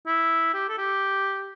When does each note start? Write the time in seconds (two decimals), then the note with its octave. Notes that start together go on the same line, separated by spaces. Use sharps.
0.07 E4
0.54 G4
0.69 A4
0.78 G4